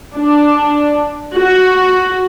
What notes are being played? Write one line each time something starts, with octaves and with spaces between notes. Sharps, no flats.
D4
F#4